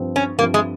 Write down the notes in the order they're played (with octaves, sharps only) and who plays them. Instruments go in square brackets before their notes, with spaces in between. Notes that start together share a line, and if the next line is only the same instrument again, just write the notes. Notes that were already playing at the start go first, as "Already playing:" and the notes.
Already playing: [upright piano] G2 F3 C4
[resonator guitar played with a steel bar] C#4
[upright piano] G2 F3 C4 [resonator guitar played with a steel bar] A#3
[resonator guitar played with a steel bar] G#3